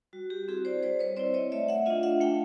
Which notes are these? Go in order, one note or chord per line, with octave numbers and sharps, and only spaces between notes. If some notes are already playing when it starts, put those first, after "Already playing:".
G3 F#4
G4
C4 E4 F#4 G#4
C5 D5
G3 C5 D5
B4 C#5
C4 E4 C5 D5
C#5 D#5
A3 D5 E5
E5 F#5
D4 F4 D#5 F5
E5 F#5
A3 F5 G5